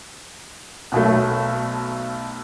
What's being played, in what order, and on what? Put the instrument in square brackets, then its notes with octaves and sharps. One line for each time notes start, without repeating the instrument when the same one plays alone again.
[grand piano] B1 B2 F#3 A3